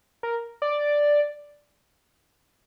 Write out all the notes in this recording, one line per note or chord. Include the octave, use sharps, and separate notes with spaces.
A#4
D5